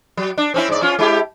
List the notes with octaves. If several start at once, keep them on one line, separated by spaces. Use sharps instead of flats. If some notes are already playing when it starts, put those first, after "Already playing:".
F#3
D4
C4 C#4 E4
G#2 D5
C#4 F4
G#3 E4 G4